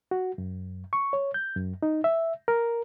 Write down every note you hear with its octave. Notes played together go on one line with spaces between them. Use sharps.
F#4
F#2
C#6
C#5
G6
F#2
D#4
E5
A#4